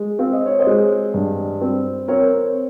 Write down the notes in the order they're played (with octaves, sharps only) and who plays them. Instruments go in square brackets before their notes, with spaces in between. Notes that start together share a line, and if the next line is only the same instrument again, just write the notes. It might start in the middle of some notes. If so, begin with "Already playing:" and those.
Already playing: [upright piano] G#3
C4 F5
D#5
C#5
C5 D#5
G#3
G2
C4
C4 A#4 C#5